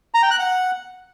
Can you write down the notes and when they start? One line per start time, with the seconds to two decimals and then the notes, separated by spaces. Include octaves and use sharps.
0.14 A#5
0.23 G5
0.31 F#6
0.39 F#5